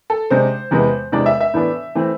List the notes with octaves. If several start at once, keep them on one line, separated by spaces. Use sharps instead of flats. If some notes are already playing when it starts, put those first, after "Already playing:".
A4
C3 G#3 D4 C5
E2 C3 G#3 B3
E2 C3 E3 G#3 D4 D5
E5
E5
A2 E3 B3 D4
E3 A3 C4